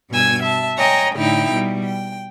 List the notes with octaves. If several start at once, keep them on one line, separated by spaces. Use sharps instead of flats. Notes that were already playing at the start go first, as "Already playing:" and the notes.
G2 B2 G#5 E6 G#6
E5 A5
C#5 D#5 G5 G#5 A#5
A2 D3 D#4 E4 G5
B2 G3
G5